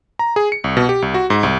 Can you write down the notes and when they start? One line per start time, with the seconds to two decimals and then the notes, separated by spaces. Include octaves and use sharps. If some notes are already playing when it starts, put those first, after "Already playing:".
0.19 A#5
0.36 G#4
0.52 C#7
0.64 C2
0.77 B2
0.89 G4
1.02 C2
1.14 F#4
1.30 G#2
1.43 C2